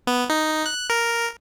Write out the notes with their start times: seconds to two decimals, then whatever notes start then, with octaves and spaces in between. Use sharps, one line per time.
0.07 B3
0.30 D#4
0.66 F#6
0.90 A#4